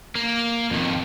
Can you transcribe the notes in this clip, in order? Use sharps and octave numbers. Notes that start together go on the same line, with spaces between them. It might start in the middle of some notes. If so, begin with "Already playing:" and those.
A#3
F2 D#3